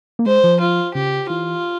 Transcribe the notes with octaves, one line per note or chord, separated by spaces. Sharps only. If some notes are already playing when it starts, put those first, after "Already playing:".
A#3
G#3 C5
F3
F4
C#3 G4
E3 F4